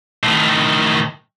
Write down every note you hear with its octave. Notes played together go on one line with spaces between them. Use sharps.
A2 D#3